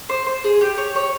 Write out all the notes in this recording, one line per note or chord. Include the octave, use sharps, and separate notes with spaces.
C5
C5
G#4
G4
C#5
C#5